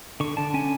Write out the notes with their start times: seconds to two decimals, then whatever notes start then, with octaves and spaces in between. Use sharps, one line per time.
0.20 D3 C#6
0.37 D3 A5
0.54 C#4 G#5